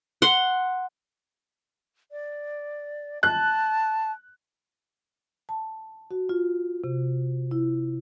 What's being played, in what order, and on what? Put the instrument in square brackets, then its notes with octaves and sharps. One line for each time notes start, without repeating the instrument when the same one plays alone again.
[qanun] F#5 C6
[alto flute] D5
[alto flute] A5 [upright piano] F#6
[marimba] A5
F#4
F4
C3
E4